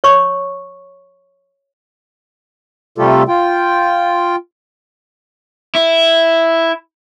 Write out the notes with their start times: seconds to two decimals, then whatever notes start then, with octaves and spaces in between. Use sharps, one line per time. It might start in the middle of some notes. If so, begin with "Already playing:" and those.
0.04 C#5 C#6
2.98 C3 G3 A3 F4 G4 A4
3.28 F4 G5
5.75 E4